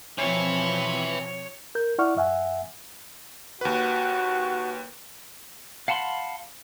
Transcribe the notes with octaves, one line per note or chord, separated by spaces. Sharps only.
B2 E3 F3 C4 C#5
A#4 G6
E4 D5 F#5 C#6 F6
F#2 E5 F#5 G#5
D#2 F#4 B4
F5 F#5 A5 B5 C6